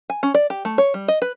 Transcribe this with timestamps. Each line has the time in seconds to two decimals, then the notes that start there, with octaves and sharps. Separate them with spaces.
0.10 G#5
0.23 C#4
0.34 D5
0.50 G4
0.65 A3
0.78 C#5
0.94 G3
1.08 D#5
1.22 B4